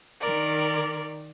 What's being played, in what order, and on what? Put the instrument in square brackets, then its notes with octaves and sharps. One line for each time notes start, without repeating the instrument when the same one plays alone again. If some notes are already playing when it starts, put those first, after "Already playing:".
[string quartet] D#3 A#4 D5